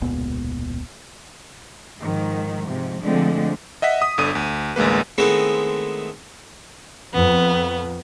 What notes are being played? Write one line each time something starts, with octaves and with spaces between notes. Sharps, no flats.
E1 C#2 A#2 B3
G#2 D#3 F3
G#2 C3 F3
D3 F3 G#3 A3 C4 D4
D#5 E5 F#5 B6
D#6
G1 D3 D#6 D#7
D2
A1 D2 G#3 A#3 B4
D#3 G#3 A3 B3 C4 E4
F2 B3